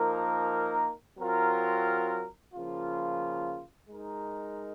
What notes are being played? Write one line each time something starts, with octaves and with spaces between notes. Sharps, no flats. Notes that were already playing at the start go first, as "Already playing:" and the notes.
Already playing: F3 A#3 D#4 A#4
F#3 C4 F4 A#4
C#3 F3 A#3 F4
G#3 D#4 A#4